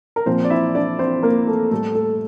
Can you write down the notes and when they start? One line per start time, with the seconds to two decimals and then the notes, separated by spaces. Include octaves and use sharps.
0.16 A#4
0.26 A#2 F3 C4 C5
0.44 D5
0.50 E4 E5
0.75 D4 D5
0.99 C4 C5
1.23 A#3 A#4
1.47 A3 A4
1.71 A2 G3 A3 A4
1.95 A3 A4